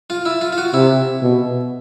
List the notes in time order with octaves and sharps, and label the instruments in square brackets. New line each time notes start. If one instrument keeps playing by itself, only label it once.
[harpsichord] F4
E4
F4
F4
F#4
[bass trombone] C3 [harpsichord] E4
[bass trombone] B2